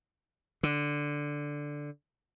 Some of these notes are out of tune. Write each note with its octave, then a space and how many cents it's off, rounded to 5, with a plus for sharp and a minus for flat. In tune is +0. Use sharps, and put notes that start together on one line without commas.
D3 +0